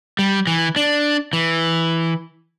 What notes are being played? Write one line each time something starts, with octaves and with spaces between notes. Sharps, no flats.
G3
E3
D4
E3